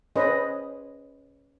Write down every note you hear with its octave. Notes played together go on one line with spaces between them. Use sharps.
C#4 G#4 B4 C5 D#5